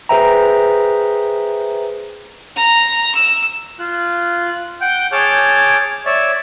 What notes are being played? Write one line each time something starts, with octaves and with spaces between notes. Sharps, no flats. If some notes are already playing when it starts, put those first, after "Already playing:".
G#4 B4 C5 E5 G5 A#5
A#5
E6
F4 F#6
F#5 G5 G6
G#4 C#5 A5 D6 F6 G6
C#5 D5 E5